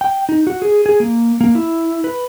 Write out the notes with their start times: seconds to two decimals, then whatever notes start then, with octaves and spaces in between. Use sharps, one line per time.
0.01 G5
0.29 D#4
0.47 F#4
0.62 G#4
0.86 G#4
1.00 A#3
1.41 A#3
1.55 E4
2.04 B4